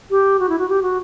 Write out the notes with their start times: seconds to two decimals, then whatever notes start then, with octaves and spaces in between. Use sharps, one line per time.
0.10 G4
0.39 F#4
0.49 E4
0.58 F#4
0.69 G4
0.82 F#4